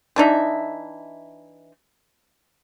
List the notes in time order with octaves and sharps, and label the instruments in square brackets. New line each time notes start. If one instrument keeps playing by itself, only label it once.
[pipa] E3 D4 D#4 E5